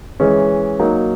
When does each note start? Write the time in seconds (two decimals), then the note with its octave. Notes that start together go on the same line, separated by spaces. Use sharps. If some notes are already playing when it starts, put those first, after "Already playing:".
0.20 E3 G#3 C#4
0.79 F#3 A#3 D#4